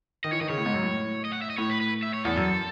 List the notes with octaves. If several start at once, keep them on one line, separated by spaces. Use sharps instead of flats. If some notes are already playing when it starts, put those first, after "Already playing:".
D#3 D#5
E3 C#5
D#3 D#5
C#3 C#5
A2
G#2
F#2
A2
D#5
F#5
E5
D#5
A2 C#5
B4
B4
E5
C#5
E2 A4
F#2